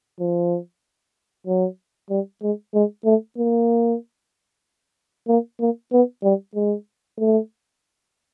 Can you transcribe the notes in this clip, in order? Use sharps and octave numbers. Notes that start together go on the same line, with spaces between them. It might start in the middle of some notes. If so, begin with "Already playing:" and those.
F3
F#3
G3
G#3
G#3
A3
A#3
A#3
A#3
B3
G3
G#3
A3